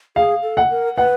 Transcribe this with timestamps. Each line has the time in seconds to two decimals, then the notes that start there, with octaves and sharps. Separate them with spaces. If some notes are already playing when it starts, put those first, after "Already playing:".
0.16 G#4 F5
0.43 A4
0.57 F#5
0.70 A#4
0.97 B4 F#5